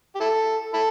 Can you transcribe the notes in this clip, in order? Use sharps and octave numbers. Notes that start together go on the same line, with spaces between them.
G4
E4 A4
E4 A4